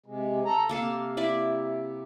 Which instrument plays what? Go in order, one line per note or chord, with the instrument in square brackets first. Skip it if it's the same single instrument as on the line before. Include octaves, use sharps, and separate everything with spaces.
[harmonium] C3 G#3
A4 A#5
[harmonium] C3 [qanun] A#3 A4 F5
[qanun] E4 D5